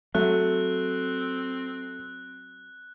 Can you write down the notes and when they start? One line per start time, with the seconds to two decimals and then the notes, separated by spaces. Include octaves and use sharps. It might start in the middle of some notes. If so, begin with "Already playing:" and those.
0.15 F#3 A3 C4 F#6